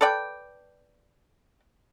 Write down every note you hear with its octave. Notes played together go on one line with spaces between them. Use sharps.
A4 B4 D5 G5